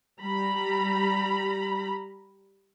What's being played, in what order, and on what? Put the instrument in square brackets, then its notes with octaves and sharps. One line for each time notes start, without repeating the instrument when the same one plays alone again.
[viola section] G3 A#5 B5